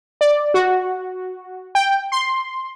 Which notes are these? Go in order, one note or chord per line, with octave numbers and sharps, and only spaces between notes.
D5
F#4
G5
C6